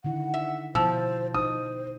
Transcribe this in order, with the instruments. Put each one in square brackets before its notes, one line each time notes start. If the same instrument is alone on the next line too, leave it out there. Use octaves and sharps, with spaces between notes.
[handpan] D3 D#3 E4 [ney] F#5
[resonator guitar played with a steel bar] E5
[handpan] B2 E4 [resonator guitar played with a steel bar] F3 [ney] C5 [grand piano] E6
[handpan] D#4 [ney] C5 [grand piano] D#6